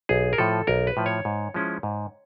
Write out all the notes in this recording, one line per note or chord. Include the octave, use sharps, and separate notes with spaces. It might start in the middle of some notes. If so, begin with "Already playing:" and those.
B1 G#4
A#4
A2 F3 A4
B1 A#4
B4
A2 F3
C#5
G#2
F3 G#3 C#4 E4
G#2